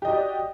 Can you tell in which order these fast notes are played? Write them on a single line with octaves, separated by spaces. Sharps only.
G4 D#5 F#4 D5